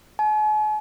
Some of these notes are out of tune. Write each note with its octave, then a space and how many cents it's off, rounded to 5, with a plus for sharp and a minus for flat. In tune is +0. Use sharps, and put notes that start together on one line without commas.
G#5 +45